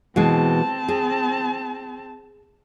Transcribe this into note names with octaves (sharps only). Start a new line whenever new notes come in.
B2 E3 G#3 C4 A5
G#4